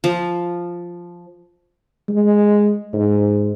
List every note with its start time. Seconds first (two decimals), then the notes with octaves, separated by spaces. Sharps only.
0.04 F3
2.09 G#3
2.93 G#2